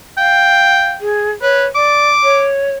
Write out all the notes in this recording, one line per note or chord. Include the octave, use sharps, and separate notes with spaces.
F5 G5
G#4
B4 C#5
D5 D6
C#5